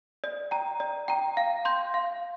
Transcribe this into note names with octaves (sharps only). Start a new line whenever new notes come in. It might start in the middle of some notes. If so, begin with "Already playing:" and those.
D5
G5 A#5
D5
G5 A#5
F5
C6 G6
F5